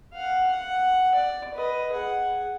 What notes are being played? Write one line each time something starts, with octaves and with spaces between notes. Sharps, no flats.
F5 F#5
F#5
D5
B4 D#5
G#4 F#5